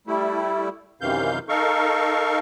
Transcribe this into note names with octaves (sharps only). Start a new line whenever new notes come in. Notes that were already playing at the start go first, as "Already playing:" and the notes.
G3 A3 E4
F#2 C3 D#3 E3 F5 G6
D#4 A4 A#4 F5 C#6